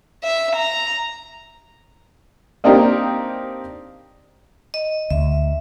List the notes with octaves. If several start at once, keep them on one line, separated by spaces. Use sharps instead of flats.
E5
A#5
A#3 C4 D4 D#4 G4 A#4
D#5
D2 E5